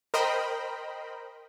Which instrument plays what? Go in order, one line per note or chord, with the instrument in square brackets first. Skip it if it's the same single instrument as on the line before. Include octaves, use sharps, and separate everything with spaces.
[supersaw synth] A#4 C5 D#5 G5 B5